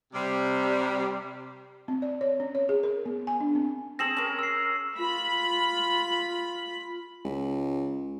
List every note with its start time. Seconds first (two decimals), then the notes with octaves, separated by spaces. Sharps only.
0.13 C3 G3
1.88 C4
2.02 D5
2.21 C#5
2.40 C#4
2.55 C#5
2.69 G#4
2.83 A#4
3.06 B3
3.27 G#5
3.41 D4
3.55 C4
3.99 C4 G#4 A4 A#6 E7 F#7
4.17 C#4 A#4
4.39 E6 C7
4.98 F4 B5
7.25 C#2